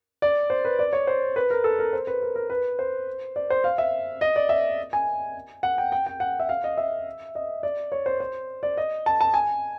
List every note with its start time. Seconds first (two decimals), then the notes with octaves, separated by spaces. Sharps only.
0.22 D5
0.50 C5
0.65 B4
0.79 D5
0.93 C#5
1.07 C5
1.36 B4
1.50 A#4
1.64 A4
1.79 A#4
1.93 C5
2.07 B4
2.22 A#4
2.35 A#4
2.50 B4
2.79 C5
3.36 D5
3.50 C5
3.64 F5
3.78 E5
4.21 D#5
4.36 D5
4.49 E5
4.93 G#5
5.63 F#5
5.78 G5
5.92 G5
6.06 G5
6.20 F#5
6.40 E5
6.49 F5
6.64 D#5
6.77 E5
7.35 D#5
7.63 D5
7.92 C#5
8.06 C5
8.20 C5
8.63 D5
8.77 D#5
9.06 A5
9.21 A5
9.34 G#5